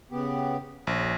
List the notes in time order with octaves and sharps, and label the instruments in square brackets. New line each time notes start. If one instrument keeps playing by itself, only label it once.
[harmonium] C#3 B3 G4
[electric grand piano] A#1 [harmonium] C#4